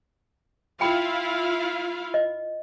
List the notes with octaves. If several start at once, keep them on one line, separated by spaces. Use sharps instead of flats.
E4 F4 F5 G5 B5
D#5